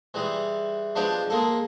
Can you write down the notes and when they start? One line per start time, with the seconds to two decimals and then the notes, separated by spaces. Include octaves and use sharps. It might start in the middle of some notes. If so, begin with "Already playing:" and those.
0.14 E3 G3 G#3
0.95 F3 G#3 B3 D4 G4
1.30 G#3 A#3 A4